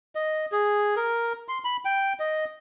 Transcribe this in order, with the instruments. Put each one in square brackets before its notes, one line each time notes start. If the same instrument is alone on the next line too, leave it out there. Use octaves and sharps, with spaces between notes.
[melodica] D#5
G#4
A#4
C6
B5
G5
D#5